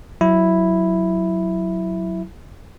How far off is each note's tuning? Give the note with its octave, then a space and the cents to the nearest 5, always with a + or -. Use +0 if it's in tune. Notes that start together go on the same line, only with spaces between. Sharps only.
F#3 +0 E4 +0